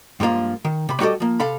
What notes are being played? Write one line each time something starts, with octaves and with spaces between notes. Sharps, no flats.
G2 F3 G#3 A#3 F4
D#3
C3 B5
G3 F#4 G4 A4 D#5
F3 A#3
C3 A4 F5 B5